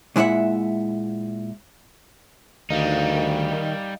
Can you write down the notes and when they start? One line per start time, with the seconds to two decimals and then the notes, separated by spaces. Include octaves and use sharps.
0.16 A#2 G#3 E4 E5 F#5
2.70 D2 D#3 G3 D#4 D#5 F5